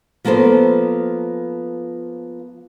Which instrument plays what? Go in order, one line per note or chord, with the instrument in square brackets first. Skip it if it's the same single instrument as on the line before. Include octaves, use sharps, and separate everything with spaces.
[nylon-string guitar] F3 A#3 B3 A4 C5